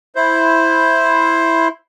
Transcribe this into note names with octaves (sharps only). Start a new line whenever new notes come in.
E4 C5